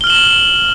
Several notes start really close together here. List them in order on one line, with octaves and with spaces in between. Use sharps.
G7 F6 F#7 E7